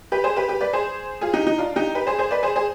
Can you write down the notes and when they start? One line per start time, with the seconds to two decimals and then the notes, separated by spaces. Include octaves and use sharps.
0.12 G4 B4
0.24 G#4 C5
0.36 G4 B4
0.49 G4 B4
0.61 B4 D5
0.73 G#4 C5
1.21 F4 G#4
1.33 D#4 G4
1.47 D#4
1.58 D4 F4
1.76 D#4 G4
1.95 G4 B4
2.07 G#4 C5
2.19 G#4 C5
2.31 B4 D5
2.43 G#4 C5
2.56 G#4 C5